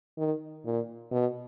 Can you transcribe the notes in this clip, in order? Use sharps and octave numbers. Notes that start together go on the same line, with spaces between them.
D#3
A#2
B2